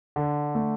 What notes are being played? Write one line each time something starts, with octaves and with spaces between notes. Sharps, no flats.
D3
A3